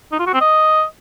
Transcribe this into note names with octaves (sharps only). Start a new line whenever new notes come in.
D#4
F4
F#4
C4
D#5